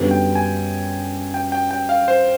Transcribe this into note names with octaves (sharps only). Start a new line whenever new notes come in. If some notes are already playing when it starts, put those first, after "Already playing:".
Already playing: F#2 D3 G3 B3
G5
G#5
G5
G5
G5
F5
C5